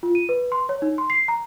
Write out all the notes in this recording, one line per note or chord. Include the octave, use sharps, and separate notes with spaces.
F4
D#7
B4
C6
C#5
D#4
C6
C7
A#5